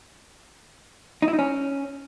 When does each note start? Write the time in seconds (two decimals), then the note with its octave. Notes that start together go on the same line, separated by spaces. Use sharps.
1.22 D#4
1.28 E4
1.33 D#4
1.39 C#4